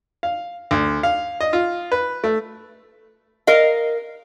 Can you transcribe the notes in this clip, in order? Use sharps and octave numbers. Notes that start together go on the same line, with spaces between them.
F5
D2
F5
D#5
F4
B4
A3
A#4 D#5 F5